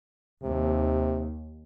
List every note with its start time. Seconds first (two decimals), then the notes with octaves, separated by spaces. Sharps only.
0.43 D#2 C3